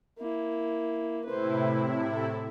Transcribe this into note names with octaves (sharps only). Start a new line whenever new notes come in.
A#3 E4
A2 C3 E4 B4 C5
A4